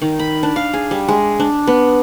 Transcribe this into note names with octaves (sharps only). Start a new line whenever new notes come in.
D#3
B5
D4
F5
G#4
G3
G#3
D4
B3